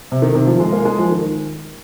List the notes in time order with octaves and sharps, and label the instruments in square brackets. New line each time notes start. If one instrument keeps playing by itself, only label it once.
[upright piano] C3
D#3
C3
F3
G#3
A#3
G#3
F3
D#3